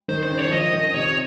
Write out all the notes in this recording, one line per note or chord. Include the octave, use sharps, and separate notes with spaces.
D#3 C5
C5
C#3
C#5
F3
D#3 D#5
D#3
C3 C#5